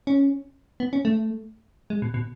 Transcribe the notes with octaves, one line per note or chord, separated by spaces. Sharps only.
C#4
B3
C#4
A3
G#3
B2
B2